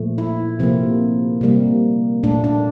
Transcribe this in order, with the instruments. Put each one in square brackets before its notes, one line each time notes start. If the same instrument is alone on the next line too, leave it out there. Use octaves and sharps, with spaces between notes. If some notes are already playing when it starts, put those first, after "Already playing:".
Already playing: [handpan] A#2 F3 A3
E4
C3 F3 A#3 C4
C3 G3 A#3
A#2 A3 D4
D4